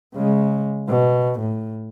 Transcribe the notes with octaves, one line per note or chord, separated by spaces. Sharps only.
C#3 G#3
B2
A2